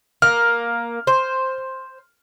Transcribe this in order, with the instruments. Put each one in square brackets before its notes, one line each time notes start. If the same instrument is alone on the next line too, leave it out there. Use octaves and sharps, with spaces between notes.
[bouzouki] A#3 [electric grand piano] F6
[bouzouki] C5